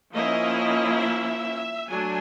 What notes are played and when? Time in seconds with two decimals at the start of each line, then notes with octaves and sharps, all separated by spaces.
0.13 F3 A#3 C#4 E4 D#5
1.01 E5
1.88 F#3 A3 D4 G#5